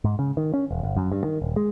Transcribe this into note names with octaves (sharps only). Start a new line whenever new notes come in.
G#2
C#3
D#3
C#4
E1
G1
F#2
G2
D#3
D#1
G#3